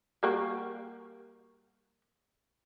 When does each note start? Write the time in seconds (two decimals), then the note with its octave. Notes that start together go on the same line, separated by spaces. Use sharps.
0.23 G3 A#3 F#4